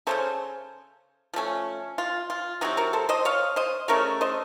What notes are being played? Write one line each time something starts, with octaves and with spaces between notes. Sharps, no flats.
C#3 A3 C#4 A4 C5
F3 A3 C#4
F4
F4
C3 F#3 C4 D#4 F#4
F#4 A#4
A4 C5
C5 D#5
C#5 F5
C5 D#5
C#3 A3 C#4 A#4 C#5
C5 D#5